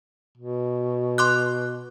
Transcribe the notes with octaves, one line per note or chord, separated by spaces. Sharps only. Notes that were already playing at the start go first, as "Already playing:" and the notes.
B2
C6 D6 F#6